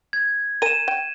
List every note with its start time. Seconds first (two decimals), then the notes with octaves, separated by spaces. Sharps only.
0.13 G#6
0.62 A#4 G#5 D#7 E7
0.88 G5